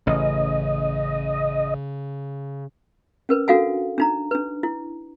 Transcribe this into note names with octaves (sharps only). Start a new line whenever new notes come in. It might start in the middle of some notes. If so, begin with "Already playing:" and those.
A1 C#3 D#5
C#4 A#4 B4
D4 F#4 A4 F5 F#5 G#5
D4 D#4 A#5
D4 B4
E4